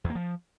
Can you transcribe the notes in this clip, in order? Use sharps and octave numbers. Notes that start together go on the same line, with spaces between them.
E2
A#3
F3